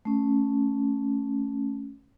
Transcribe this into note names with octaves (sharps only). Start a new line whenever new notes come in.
A3 C#4